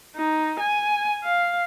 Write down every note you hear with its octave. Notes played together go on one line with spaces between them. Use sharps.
D#4
G#5
F5